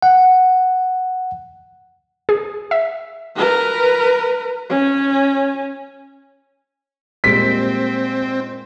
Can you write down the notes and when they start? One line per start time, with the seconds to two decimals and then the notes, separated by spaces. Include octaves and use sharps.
0.02 F#5
2.29 G#4
2.71 E5
3.35 A#4 B4
4.69 C#4
7.24 A#2 G3 G#3 A#3 C4 B6 D7